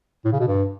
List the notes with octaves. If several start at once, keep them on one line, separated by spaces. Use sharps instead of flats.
A2
C#3
B2
G2